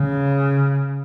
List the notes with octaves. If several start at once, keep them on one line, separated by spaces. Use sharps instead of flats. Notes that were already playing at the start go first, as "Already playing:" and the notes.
Already playing: C#3